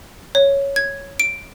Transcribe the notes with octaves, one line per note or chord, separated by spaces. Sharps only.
C#5
G#6
D7